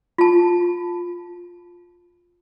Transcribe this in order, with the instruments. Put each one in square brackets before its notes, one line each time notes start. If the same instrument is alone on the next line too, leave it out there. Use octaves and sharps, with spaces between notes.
[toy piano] F4 A5